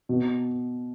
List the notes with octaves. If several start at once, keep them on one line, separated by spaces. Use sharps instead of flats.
B2